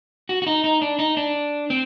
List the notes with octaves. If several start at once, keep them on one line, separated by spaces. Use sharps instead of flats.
F#4
F#4
D#4
D#4
D4
D#4
D4
C4